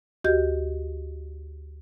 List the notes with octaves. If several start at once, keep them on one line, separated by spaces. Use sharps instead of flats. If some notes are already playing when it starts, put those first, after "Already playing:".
D2 F#4 G4 D#5 G6